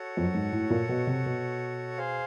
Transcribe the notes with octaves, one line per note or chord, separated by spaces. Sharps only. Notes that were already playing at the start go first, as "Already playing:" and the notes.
Already playing: F#4 A4 C#5 F#5
F2
F#2
G#2
A2
A#2
B2
C3
B2
G#4 C5 F5